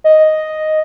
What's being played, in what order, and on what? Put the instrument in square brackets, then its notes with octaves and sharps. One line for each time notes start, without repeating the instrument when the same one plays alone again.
[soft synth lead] D#5